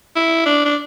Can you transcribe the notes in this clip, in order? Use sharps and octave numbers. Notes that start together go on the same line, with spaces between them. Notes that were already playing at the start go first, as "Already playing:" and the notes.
E4
D4
D4